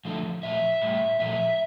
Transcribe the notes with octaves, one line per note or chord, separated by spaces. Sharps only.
D3 F3 A3
A#2 F3 A3 E5
A2 G3
A#2 F3 A3 E5